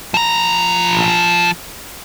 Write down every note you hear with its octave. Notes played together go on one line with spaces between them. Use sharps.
F3 A#5